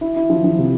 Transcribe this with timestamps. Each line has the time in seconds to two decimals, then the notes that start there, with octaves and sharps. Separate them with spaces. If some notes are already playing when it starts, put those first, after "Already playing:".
0.01 E4
0.16 E4
0.30 F3
0.44 F3
0.58 C3